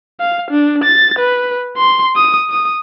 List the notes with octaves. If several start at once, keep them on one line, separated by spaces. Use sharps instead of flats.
F5
D4
A6
B4
C6
D#6
D#6